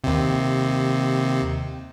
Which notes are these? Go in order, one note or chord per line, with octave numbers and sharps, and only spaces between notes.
D#2 C3